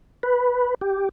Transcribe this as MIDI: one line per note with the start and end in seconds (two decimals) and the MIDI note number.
0.23 0.74 71
0.81 1.09 67